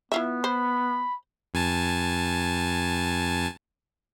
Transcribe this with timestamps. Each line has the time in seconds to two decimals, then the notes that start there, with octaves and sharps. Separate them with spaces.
0.12 B3 E4 F4 E5
0.44 C5 B5
1.54 F2 G#5 A5